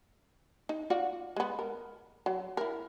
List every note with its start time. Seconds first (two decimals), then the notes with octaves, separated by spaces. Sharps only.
0.69 D#4
0.90 F4 F#4 D5
1.36 G#3 B3
1.59 A#4
2.26 F#3
2.57 E4 A#4